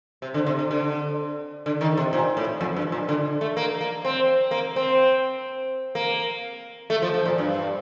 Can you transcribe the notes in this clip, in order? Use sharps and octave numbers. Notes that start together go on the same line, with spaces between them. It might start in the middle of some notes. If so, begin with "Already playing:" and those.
C3
D3
C3
D3
D3
D3
D#3
C3
A#2
A2
F2
G2
A#2
D3
A3
A#3
A#3
C4
A#3
C4
A#3
A3
F3
F3
A#2
G2